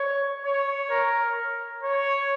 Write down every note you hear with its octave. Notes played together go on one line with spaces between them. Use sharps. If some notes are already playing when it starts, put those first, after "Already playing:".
Already playing: C#5
C#5
A#4
C#5